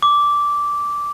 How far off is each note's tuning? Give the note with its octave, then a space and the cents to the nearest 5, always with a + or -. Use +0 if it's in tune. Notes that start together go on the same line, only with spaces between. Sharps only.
D6 -10